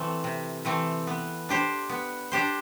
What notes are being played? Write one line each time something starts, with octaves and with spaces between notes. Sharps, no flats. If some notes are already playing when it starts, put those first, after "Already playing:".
Already playing: E3 A3 C4
C3
E3 A3 C4
B3
D4 G4 C5
B3
D4 G4 C5